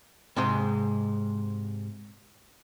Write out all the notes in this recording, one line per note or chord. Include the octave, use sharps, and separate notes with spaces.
G#2 C3 G#3 C5